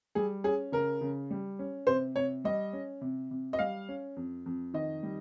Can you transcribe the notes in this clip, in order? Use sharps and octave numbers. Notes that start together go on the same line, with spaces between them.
G3 G#4
C#4 G#4
C#3 A#4
C#3
G3
C#4
C3 C5
C3 C#5
G3 D#5
C#4
C3
C3
D#5
G3 F5
C#4
F2
F2
D#3 D#5
G3